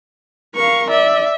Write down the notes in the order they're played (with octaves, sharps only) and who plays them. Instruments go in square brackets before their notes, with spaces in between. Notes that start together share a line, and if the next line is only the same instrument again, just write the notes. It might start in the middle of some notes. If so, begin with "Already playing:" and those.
[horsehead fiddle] A#4 F5 [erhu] C#6
[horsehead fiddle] D5 [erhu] E5